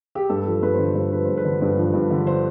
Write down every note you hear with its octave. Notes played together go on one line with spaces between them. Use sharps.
G4
G2 A4
F3
G2 B4
D3 C5
B4
G2 C5
F3 B4
G2 C5
B4
D3
G2
F3
G2
D3
C5